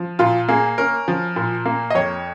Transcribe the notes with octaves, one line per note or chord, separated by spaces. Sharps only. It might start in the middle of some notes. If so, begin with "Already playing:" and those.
Already playing: F3
A#2 F4
A#3 G#4
C#4 A#4
F3
A#2
A#3
D#5
F2 C#5